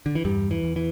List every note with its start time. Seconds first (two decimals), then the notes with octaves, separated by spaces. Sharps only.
0.06 D3
0.15 E3
0.25 E2 G2 G3
0.51 E3
0.64 E2
0.76 E3